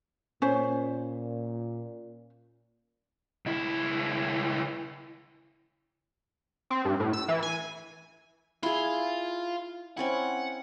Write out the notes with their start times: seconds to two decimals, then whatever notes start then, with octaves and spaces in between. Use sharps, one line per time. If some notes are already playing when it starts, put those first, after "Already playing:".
0.42 A#2 C#4 C5
3.46 C#2 E4
6.70 C4
6.85 G2
7.00 A2
7.13 E6
7.28 E3
7.43 G#5
8.63 E4 F4 G#4
9.97 C4 C#4 E4 F#5